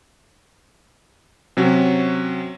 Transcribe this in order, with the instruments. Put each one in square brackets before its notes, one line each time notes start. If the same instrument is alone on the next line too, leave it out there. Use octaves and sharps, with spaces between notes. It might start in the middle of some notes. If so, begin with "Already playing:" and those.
[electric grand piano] C3 F#3 C#4 F#4